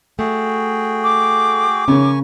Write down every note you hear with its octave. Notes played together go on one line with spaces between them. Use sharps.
A3 F#4 G#4 G5
D6
C#3 C#4 A#4 G#5 C#6